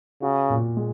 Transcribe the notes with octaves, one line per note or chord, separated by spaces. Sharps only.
C#3 F#4
A#2
G#3